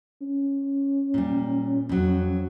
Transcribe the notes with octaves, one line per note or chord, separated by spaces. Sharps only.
C#4
A#2 G3
F2 F#3